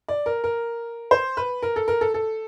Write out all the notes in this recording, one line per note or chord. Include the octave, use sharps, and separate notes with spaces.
D5
A#4
A#4
C5
B4
A#4
A4
A#4
A4
A4